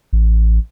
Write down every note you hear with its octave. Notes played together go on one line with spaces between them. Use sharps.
A1